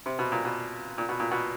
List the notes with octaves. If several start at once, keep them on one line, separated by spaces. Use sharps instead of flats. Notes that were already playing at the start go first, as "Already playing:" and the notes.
C3
B2
A#2
B2
A#2
B2
A#2
B2